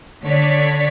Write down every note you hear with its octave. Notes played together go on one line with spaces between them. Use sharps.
D3 C#5 D5 B6